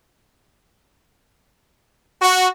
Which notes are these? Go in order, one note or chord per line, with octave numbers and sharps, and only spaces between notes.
F#4